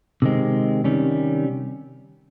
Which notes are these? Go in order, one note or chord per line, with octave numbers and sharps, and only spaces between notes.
C3 D#3 G#3 C4
C3 D#3 G3 C#4